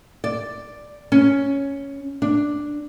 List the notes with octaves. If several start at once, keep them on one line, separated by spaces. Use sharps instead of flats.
D5
C#4
D4